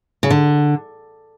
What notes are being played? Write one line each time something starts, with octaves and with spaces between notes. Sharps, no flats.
C#3
D3